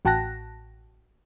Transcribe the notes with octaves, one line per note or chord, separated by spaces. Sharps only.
A1 F#4 G5 A5 F#6 A#6